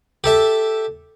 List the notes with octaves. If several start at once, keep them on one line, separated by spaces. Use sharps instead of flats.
G4 A4 E5